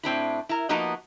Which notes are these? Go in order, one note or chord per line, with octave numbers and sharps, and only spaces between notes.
A2 C4 D4 E4
E4 A#4
F3 A#3 B3 D#4 F#4 D#5